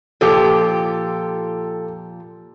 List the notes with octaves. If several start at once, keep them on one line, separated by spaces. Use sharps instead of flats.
A#2 F3 G4 A4